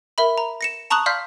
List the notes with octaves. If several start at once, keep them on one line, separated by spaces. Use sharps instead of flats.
A#4 E5 B5
A#5
A#6 C#7 E7
A5 A#5 C#6 D#6 F#6 F#7
D5 F5 C6 F6 G6 B6